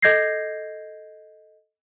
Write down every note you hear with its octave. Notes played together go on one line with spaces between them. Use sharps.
A4 D#5 G6 G#6 A#6 C7